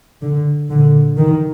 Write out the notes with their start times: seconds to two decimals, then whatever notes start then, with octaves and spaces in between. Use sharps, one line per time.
0.22 D3
0.69 A#2 D3
1.16 D#3